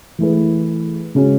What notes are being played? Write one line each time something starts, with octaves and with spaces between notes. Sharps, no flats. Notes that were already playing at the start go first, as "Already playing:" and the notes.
E3 A3 E4 G#4 B4
C#3 G#3 C#4 F#4